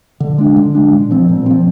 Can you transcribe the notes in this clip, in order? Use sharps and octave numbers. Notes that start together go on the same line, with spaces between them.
D3
G#3 D4
D3
G#3 D4
A#2
F3 C4
A#2
F3 C4